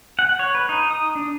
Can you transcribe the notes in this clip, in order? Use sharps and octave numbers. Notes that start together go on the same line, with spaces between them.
F#5
C#5
B4
D#4
D#6
D4